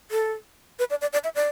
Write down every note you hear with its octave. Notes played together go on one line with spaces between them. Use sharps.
A4
B4
D5
D5
D5
E5
D5